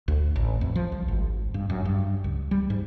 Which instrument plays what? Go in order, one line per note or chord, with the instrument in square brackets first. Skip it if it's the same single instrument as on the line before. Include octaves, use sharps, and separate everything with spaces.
[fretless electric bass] D2
A1
F2
F3
C2
G#1
G2
F#2
G2
C#2
G3
G#2